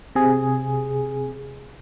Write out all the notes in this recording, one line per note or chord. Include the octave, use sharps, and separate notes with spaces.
C3 G#4